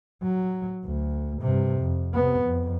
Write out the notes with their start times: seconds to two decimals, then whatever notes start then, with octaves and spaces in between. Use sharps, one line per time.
0.23 F#3
0.85 D2
1.42 G2 C3
1.80 F2
2.14 C3 B3
2.44 F2